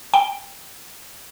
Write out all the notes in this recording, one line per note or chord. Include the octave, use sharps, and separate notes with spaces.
G5